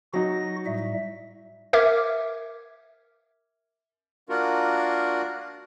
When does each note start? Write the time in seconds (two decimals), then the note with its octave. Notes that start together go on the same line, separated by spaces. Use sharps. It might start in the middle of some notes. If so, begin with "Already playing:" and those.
0.13 F#3 D#4 F#4 A#6
0.66 A2 G3 E5
1.73 A#4 E5 D6 F6 G#6
4.29 A#3 D4 F4 F#4 A#4